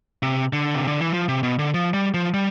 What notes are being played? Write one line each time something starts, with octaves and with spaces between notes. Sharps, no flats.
C3
D3
C3
D3
E3
F3
C3
B2
D3
F3
G3
F3
G3